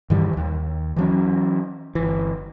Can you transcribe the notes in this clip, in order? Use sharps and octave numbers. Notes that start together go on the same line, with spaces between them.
G2 D#3 E3 G3
D#1 D#2
E3 F#3 C#4
G1 E3